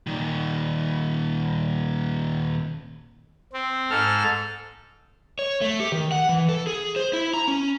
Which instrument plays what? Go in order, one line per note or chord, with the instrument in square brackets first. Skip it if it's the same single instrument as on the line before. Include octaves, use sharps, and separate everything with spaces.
[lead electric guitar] A#2 D#3
[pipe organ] C4
G#2 A4 F6
[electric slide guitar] C#5
A3
G4
D#3
F#5
E3
A4
G#4
C5
E4
A#5
C#4